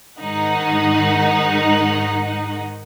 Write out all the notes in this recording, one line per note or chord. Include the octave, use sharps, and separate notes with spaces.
G#2 D#3 D#4 F#5